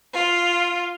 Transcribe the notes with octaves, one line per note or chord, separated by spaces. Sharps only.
F4